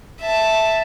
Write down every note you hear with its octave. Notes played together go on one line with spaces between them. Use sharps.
E5 A5